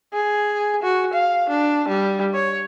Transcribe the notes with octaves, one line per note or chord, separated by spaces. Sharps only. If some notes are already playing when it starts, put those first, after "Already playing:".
G#4
F#4
F5
D4
G3
C#5